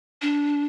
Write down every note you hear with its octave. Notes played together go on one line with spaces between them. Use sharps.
D4